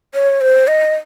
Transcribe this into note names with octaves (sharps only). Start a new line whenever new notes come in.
C#5
C5
D#5